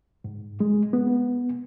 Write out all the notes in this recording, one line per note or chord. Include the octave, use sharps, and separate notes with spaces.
G#2
G#3
B3